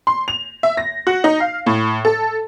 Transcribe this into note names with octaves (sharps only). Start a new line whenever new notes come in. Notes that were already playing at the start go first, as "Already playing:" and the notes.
C6
F7
E5
A#6
F#4
D#4
F5
A2
A4